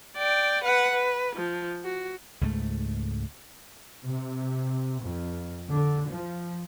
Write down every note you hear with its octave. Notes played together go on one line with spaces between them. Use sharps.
D5 G5
B4 F#5
B4
F3
F#4
C#2 G#2 A3
C3
F2
D3
F3